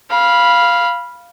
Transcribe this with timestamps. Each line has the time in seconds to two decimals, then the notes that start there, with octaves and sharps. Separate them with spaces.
0.10 F5 B5